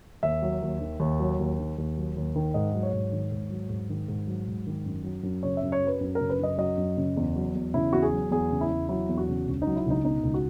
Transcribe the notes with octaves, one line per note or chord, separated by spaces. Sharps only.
D#2 E5
F#3
D#2
D#3
D#2
F#3
D#2
D#3
D#2
F#3
D#2
D#3
G#2 D#5
F#3
C#5
G#2
D#3
G#2
F#3
G#2
D#3
G#2
F#3
G#2
D#3
F#2
F#3
F#2
C#3 C#5
E5
F#2
C#5
F#3
B4
F#2
C#3 A#4
B4
F#2 D#5
F#3 D#5
F#2
C#3
E2
F#3
E2
C#3 E4
E2 F#4
G#4
F#3
E2 G#4
C#3
E4
E2
F#3 E4
E2
F#4
C#3
C#2
D#4
F#3
E4
C#2 D#4
B2 D#4
C#2
F#4